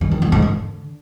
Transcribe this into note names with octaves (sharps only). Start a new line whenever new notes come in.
E3
D#3
E2
G#2
D3